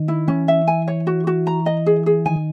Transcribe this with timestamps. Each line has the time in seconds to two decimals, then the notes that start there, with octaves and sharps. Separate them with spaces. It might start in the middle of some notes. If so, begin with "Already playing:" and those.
Already playing: D#3
0.08 E4
0.28 E3 C#4
0.48 E5
0.67 G#5
0.88 C#5
1.07 F#4
1.27 F#4
1.47 A#5
1.66 D#5
1.86 G#4
2.06 G#4
2.26 D#3 G#5